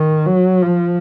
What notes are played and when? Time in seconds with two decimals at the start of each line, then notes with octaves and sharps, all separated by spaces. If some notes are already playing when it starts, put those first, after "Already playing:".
Already playing: D#3
0.26 F#3
0.62 F3